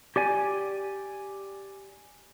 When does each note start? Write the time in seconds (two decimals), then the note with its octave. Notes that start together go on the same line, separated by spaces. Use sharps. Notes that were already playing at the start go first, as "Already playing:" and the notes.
0.16 G4 D5 G#5